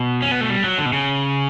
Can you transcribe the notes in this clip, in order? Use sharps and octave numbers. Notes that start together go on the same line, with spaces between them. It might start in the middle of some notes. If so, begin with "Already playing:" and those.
Already playing: B2
C#4
B3
A3
G3
F#3
D3
B2
C#3